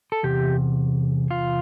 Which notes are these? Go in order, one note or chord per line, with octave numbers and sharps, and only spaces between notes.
A4
E2 C3 G4
F4